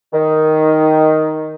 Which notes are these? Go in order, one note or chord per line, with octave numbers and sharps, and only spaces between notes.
D#3